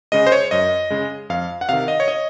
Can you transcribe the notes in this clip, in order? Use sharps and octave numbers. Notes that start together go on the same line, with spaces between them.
C#3 G#3 D#5
C5
C#5
F#2 D#5
C#3 G#3
F2 F5
F#5
C3 D#3 F5
D#5
C#5
D#5